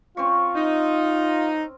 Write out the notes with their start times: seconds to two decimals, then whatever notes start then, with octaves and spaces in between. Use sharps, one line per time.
0.17 C4 C#4 F4 C#6
0.56 D#4